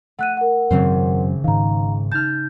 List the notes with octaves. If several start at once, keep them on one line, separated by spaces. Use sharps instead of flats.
A3 F#5 F#6 D#7
A#4 F#5
G#1 F#2 C#3 F#3 C4 C5
G#2 D#3 F5 A#5
D#4 A5 F6 G6